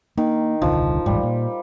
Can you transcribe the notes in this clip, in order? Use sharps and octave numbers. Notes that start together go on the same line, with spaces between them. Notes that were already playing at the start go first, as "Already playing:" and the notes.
D#3 A#3
D#1 C2 D3 F3
D#1 A1 G#2 G3
A#2